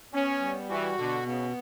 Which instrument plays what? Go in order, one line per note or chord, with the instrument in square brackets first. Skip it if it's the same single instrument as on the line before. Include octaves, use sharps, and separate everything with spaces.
[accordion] B3 [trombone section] C#4
[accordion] G3
[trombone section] E3 [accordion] F#4
[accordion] B2 [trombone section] D3
[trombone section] C#3 [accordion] B3